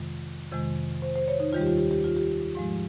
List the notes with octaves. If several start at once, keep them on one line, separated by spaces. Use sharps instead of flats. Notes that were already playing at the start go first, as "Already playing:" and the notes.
Already playing: F2 C3 D#3 G#3
F2 C3 D#3 G#3
C5
C5
C#5
D#4
D#2 D#3 G3 F4
G4
F4
G4
G4
F4
G4
G#2 F3 G#3